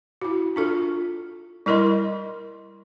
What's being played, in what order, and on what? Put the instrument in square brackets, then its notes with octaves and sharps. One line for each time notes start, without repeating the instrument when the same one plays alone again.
[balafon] E4 F#4
D4 F4 A4
G3 E4 A#4 D#5 C6